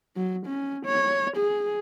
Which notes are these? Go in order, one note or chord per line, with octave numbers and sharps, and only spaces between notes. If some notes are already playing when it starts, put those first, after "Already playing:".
F#3
C#4
C#5
G#4